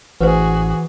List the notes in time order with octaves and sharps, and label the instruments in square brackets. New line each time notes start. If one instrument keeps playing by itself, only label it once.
[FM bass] A1 [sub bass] E3 [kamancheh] F#4 G#4 [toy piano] B4 C5